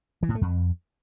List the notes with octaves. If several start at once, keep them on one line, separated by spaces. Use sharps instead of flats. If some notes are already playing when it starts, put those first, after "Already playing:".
E3
A2
A3
F2